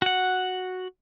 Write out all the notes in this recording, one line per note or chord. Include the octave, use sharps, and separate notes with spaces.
F#4 F#5